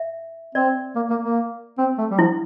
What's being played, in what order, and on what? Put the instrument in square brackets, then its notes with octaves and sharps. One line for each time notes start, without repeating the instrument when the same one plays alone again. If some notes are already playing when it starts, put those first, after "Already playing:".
Already playing: [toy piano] E5
[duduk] C4 [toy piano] D5
[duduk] A#3
A#3
A#3
C4
A3
G3
[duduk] F3 [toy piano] E4